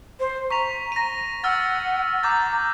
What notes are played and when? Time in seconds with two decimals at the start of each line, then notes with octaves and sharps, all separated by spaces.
0.20 C5
0.50 A#5 C#6 B6 F7
0.92 A#6 D#7
1.44 F#5 E6 F6 A6
2.23 A#5 D6 G6 A6